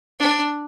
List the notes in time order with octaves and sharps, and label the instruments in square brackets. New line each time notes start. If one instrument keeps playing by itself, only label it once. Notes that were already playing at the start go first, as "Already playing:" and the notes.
[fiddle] D4